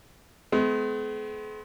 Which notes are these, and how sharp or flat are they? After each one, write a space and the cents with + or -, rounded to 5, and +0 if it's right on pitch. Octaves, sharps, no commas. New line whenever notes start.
G#3 +45 B3 +45